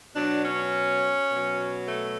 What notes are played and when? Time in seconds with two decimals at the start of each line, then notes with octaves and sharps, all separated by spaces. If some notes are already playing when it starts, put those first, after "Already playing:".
0.14 B2 F#3 D4
0.43 C#4
1.29 B2 F#3
1.87 A3